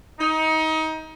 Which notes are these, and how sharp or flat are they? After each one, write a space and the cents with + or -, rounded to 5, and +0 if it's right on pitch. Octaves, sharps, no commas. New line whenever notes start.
D#4 +25